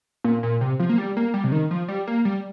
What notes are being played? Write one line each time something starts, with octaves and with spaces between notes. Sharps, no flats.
A#2
A#2
C3
F3
A#3
G3
A#3
G3
C3
D#3
F3
G3
A#3
G3